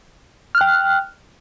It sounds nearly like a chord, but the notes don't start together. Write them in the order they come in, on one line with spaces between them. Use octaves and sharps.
F6 F#6 G5